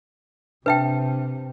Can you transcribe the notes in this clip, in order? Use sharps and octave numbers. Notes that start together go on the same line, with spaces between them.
C3 D4 B4 E5 G5 A5